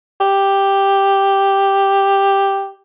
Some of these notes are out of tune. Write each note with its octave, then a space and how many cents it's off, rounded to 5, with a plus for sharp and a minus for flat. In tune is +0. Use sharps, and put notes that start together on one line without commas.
G4 +5